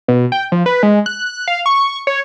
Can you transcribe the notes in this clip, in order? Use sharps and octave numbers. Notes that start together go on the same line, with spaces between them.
B2
G5
F3
B4
G#3
F#6
F5
C#6
C#5